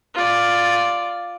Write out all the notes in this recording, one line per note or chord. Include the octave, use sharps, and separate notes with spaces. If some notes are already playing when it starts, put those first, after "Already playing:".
F4 D5